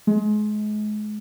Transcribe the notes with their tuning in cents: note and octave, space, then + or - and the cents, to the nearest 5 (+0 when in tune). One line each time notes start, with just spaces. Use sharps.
G#3 +30